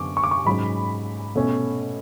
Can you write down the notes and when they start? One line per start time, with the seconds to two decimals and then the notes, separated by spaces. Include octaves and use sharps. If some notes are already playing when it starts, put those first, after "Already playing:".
Already playing: F#2 D3 B3 C#6 D6
0.17 C#6
0.24 D6
0.31 C#6
0.46 G#2 F#3 C#4 B5
1.35 B2 A3 C#4